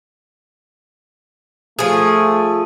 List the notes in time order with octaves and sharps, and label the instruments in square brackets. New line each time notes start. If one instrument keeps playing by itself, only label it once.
[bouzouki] F3 G#4 [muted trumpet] A3